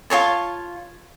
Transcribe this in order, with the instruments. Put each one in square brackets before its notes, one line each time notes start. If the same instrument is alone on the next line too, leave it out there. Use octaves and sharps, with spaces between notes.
[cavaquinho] F4 G#4 C#5 A5